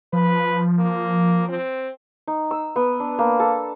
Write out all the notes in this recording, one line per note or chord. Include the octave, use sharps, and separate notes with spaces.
F3 B4
A#3
C4
D#4
E6
B3
D4
A#3
A4